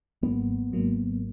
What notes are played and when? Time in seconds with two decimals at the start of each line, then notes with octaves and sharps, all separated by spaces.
0.23 G#1 G#2 F#3 A#3 B3
0.71 G#1 G#2 F#3 A#3